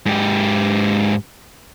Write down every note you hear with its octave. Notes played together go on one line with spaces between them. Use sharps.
G#2 G4